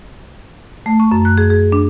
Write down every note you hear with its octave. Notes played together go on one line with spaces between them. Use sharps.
A3
C#6
F#2
F#6
G#4
G#4
D4